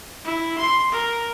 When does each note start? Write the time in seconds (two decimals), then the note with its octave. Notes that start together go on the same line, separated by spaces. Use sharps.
0.25 E4
0.59 C6
0.93 A#4